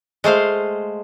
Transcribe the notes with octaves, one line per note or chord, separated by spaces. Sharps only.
G#3 A3 C5 F5